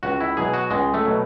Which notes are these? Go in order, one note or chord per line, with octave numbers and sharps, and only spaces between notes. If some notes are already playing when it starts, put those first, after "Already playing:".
C#2 F#4
E4
B2 F#3 G#4
F#4
C#2 G#3
A3
B2 F#3